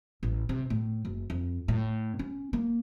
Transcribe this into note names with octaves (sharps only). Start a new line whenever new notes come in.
A1
C3
A2
F#1
F2
A2
C#4
A#3